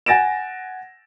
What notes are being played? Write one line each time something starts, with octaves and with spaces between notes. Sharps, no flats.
F#5 G#5 A6 A#6 D7 E7